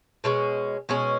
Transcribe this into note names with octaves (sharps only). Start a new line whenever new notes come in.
B2 G#3 C#4
B2 G#3 C#4